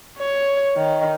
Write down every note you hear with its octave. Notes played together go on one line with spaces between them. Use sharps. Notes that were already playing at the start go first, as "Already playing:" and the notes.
C#5
D#3